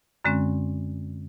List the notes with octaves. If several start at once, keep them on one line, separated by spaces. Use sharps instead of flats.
F#2 D3 G#3 C4 C#4